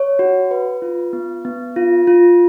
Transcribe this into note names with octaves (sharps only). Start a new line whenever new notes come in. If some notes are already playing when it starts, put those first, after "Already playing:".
Already playing: C#5
F#4
B4
F4
B3
B3
F4
F4